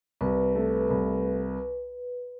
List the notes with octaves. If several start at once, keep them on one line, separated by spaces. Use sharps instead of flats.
C2 B4
A3
C2